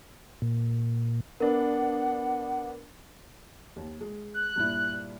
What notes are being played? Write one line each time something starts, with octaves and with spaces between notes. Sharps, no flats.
A#2
B3 D4 A#4 F#5
D#2
G#3
F#6
G2 A#2 E4